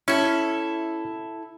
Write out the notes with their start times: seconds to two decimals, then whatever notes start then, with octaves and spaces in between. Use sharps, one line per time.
0.08 C#4 E4 A4